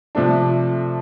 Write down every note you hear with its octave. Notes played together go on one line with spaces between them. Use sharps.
C3 F3 A3 D4